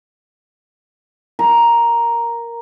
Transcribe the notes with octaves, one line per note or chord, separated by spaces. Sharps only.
A#4